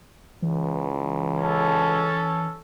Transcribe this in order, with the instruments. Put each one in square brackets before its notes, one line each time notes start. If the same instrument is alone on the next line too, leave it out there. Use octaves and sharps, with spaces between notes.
[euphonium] C#2 [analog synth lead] E3
[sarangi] C#4 [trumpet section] A4